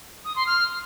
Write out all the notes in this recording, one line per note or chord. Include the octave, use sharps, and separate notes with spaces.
D#6
C6
F6